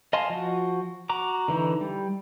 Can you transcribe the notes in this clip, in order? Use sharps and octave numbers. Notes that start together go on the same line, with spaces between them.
D#5 F5 G#5 A5 C6
F3 F#4
F#4 A#5 D6
D3 E3 D#4
G3